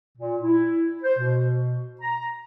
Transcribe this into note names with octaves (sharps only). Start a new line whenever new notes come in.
A#2
E4
C5
B2
A#5